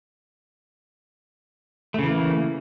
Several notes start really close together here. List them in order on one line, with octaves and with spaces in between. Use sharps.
A3 C#3 E3 A#3